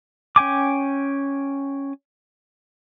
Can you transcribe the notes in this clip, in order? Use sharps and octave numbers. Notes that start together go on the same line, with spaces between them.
C#4 G5 G#5 D6